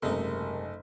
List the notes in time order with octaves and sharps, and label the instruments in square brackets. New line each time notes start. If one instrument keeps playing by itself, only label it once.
[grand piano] F#1 [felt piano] G#2 C3 [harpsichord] A3 D#4 [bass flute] A#4